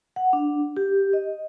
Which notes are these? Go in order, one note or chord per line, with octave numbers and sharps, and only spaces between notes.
F#5
D4
G4
D#5